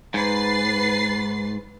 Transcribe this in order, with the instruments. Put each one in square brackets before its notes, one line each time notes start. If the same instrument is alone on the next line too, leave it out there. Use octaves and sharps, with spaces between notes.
[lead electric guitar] G#2 [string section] B4 A6 C7